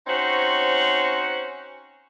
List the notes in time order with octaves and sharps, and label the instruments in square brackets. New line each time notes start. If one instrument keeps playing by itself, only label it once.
[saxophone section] C4 C#4 D#4 F#4 C5 C#5